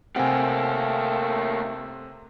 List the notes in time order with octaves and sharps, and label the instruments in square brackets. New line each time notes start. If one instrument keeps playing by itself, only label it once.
[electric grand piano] C3 C4 [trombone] A3 [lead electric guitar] A#3 G4 [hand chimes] F#5 G#5